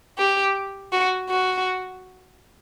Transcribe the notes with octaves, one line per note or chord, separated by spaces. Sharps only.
G4
F#4
F#4